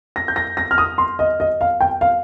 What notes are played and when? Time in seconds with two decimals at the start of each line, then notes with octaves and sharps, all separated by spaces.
0.16 A#6
0.28 G6
0.36 A#6
0.57 A#6
0.71 F6
0.78 D#6
0.98 C6
1.19 D#5
1.40 D#5
1.61 F5
1.81 G5
2.01 F5